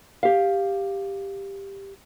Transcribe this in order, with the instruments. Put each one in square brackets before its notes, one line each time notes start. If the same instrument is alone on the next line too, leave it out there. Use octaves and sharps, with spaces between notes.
[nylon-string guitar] G4 F5